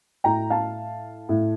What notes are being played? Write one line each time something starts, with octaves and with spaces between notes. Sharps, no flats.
A2 G5 A#5
F5 A5
A2